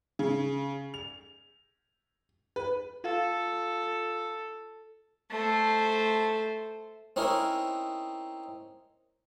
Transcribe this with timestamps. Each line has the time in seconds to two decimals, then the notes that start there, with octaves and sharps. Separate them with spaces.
0.19 C#3
0.94 F7
2.56 B4
3.04 F4 A4 F5
5.31 A3 C5
7.16 C4 C#4 D#4 E4 A#4